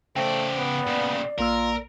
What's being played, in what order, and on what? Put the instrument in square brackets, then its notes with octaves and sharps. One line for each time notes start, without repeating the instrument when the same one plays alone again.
[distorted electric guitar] C#3 D5 [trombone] A3 [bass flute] C5 [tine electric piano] G5
[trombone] B3
[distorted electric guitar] A#2 C#3 [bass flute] D5
[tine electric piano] A#1 A#3 E6 [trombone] F4 [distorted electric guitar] A#4